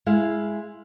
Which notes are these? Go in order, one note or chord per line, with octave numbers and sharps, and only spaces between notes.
G#3 E4 F5